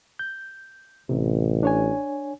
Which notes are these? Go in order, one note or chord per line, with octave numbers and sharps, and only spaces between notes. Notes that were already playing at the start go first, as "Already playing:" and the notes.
G6
A1 C3
D4 C#5 G#5